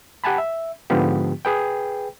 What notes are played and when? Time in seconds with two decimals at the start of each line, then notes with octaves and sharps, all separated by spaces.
0.24 G4 F#5 G#5 A5 B5
0.38 E5
0.90 G#2 D3 F3 B3 F4 G4
1.45 G#4 B4 G5